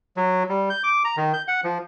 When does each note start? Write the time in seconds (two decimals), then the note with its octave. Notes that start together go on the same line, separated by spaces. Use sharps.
0.17 F#3
0.49 G3
0.70 G6
0.84 D6
1.05 A#5
1.17 D#3
1.34 G6
1.48 F#5
1.64 F3